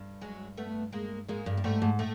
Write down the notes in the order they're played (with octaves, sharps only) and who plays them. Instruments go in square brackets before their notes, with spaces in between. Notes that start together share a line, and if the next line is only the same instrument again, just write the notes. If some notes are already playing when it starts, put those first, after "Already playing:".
Already playing: [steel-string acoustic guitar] G2
[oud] F#3 G#3
A3 B3
G#3 A#3
[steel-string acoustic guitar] G#2 [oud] G#3 A#3
[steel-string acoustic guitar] G2
A2
[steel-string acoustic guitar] G#2 [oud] G3 A3
[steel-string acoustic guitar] G#2
[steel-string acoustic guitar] A2 [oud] A3